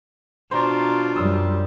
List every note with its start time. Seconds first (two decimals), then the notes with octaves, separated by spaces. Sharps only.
0.51 B2 D4 F4 C5 A#5
1.16 F#2 G3 D#6 E6